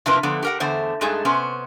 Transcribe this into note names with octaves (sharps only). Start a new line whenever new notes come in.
C3 F3 D4 E4 A#4 B4
D3 F3 B3
G4 A#4 F#5
E2 D3 A3 B3 C5
G2 G#3 A3 D#4 G#4 A4
C3 B3 C#4 C5